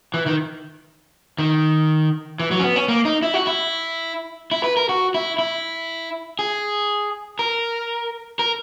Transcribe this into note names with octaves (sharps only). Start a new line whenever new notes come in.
E3
D#3
D#3
E3
F#3
C#4
B3
C#4
A#3
D#4
E4
F#4
E4
E4
B4
A#4
F#4
E4
E4
G#4
A#4
A#4